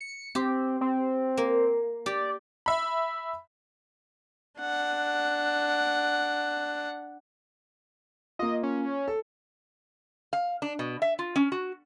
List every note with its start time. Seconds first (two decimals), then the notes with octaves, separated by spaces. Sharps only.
0.01 C#7
0.35 C4 G4
0.81 C4
1.37 A#3
2.06 G4 D5
2.66 E5 B5
4.60 D4 F#5
8.39 A#3 F4 D#5
8.63 C#4
9.08 A4
10.33 F5
10.62 D4
10.79 B2
11.02 E5
11.19 F4
11.36 C#4
11.52 F#4